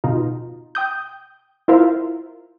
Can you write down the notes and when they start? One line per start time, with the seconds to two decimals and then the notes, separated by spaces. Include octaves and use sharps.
0.04 B2 D#4 F4
0.75 G5 D#6 G6
1.68 E4 F4 A#4 C5 E5 F5